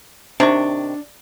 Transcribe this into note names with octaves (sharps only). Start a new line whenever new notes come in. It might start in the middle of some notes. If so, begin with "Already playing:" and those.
C3 D#3 D4 C#6